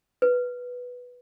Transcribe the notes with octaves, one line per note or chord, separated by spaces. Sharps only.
B4